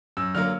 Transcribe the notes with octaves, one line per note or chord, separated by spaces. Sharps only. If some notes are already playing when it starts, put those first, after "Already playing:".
F#2 E6
D3 F#3 A#3 F6